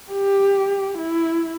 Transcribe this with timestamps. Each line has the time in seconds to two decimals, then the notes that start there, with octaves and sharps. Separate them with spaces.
0.12 G4
0.98 E4